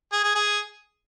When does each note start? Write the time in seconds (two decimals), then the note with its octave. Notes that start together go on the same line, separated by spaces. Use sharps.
0.12 G#4
0.24 G#4
0.35 G#4